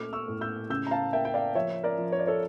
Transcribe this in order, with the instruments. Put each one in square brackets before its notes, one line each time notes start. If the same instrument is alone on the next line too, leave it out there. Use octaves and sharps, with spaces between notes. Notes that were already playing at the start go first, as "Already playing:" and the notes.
Already playing: [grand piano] A#2 A3 C#4 D6 F6
C#6 E6
A2
E6 G6
C#3 E6 G6
A#5
F5 A5
A#3 E5 G5
G5
D5 F5
F3 C#5 E5
A#4 D5
F3
C#5
D5
A4 C#5